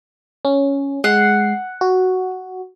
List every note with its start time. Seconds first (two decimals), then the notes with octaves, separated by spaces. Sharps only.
0.45 C#4
1.04 G#3 F#5 C7
1.81 F#4